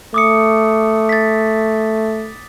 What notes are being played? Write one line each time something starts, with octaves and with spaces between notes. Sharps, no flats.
A3 D6 D#6 C#7
A6 B6